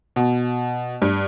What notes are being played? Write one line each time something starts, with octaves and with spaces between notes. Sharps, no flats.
B2
G2